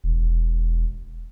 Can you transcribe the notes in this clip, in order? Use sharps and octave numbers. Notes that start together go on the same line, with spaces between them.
E1